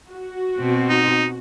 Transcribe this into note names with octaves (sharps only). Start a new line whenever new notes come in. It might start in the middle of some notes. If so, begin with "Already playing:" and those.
F#4
B2 C4
D#4